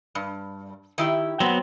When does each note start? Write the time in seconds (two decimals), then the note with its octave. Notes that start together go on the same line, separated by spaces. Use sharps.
0.15 G2
0.98 D#3 E4 G4
1.40 F#3 B3 C4